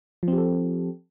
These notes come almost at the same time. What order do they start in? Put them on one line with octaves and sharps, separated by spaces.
F3 C4 G4 A4